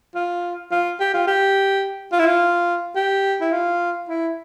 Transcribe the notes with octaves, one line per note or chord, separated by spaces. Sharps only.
F4
F4
G4
F4
G4
F4
E4
F4
G4
E4
F4
E4